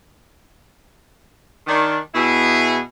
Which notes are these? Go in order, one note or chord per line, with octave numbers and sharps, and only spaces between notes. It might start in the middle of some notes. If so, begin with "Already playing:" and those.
D#3 D4
B2 E4 G#4